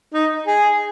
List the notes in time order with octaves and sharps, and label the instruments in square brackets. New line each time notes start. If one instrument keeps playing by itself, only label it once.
[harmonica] D#4
G#4